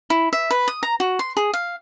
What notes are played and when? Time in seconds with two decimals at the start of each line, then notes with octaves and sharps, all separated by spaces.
0.10 E4
0.33 E5
0.51 B4
0.68 D#6
0.83 A#5
1.00 F#4
1.19 C6
1.37 G#4
1.54 F5